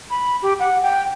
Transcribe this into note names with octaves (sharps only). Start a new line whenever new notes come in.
B5
G4
F#5
G5